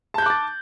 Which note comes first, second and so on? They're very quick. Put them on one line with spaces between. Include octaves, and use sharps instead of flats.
A5 G6 F#6 D6 A6